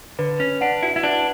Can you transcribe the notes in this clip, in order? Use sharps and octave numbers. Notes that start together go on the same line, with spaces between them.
D3 B4
C#4 B4
D4 F#5
E4 F#4
E4
D4 B4